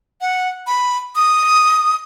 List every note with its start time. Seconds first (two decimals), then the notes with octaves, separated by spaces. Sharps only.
0.21 F#5
0.67 B5
1.16 D#6